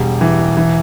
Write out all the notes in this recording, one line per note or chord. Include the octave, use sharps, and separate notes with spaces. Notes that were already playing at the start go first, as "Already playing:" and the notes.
Already playing: E1 G3
E3
E3